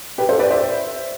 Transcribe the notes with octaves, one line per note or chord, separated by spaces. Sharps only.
G4 B4
A4 C5
B4 D5
C5 E5